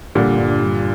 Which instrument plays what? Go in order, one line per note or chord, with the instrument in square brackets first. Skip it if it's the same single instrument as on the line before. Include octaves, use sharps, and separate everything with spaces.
[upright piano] A#2 D3 [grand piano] G3
[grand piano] G2
G2